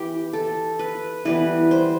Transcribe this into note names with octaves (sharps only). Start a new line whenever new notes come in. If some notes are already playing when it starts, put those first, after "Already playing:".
Already playing: E3 B3 G4
A4
B4
E3 G3 B3 B4
C5